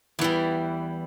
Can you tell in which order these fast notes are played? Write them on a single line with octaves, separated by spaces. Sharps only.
E2 E3 G3